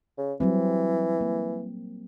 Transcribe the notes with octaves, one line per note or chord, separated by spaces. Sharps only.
C#3
E3 F#3 G3 C4
A#3